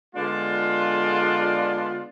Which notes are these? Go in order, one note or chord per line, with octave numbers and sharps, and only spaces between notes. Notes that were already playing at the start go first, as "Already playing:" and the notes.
D3 G#3 B3 D4 F4